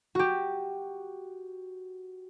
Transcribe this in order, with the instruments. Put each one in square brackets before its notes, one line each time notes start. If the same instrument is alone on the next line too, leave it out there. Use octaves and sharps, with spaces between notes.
[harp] F#4 G4